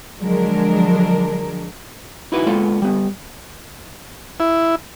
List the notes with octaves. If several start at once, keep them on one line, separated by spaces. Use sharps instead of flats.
D3 F3 F#3 G#3 D4 A#4
D#4 E4 F#4 B4
G#3 A#3 B3 F4 A4
G3 B3
E4